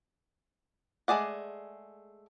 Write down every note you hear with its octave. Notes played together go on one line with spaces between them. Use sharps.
G#3 A3 G#4 D5 F#5